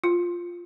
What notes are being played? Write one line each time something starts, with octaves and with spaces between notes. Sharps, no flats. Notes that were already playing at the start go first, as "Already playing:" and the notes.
F4